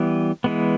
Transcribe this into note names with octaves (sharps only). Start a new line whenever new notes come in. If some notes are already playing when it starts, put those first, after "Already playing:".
Already playing: E3 G3 B3
E3 G#3 B3